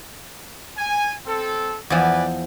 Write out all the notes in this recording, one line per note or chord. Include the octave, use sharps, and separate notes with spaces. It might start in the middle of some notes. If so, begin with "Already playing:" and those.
G#5
C4 A4
E2 F3 B4 D5 G#5